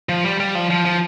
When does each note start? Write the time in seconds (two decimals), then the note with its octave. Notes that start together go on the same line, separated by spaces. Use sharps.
0.09 F3
0.25 G3
0.40 G3
0.55 F3
0.70 F3
0.85 F3